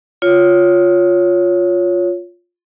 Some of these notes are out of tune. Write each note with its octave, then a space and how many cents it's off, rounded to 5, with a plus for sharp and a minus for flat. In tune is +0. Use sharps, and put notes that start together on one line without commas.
F4 +10 C#5 +10